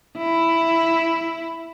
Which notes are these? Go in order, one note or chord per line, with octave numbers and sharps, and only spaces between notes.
E4